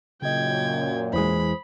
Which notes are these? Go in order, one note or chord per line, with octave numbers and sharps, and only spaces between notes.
F#2 A#2 C#3 D#5 G5 G#6
E2 E3 G#3 C5 B5 D#6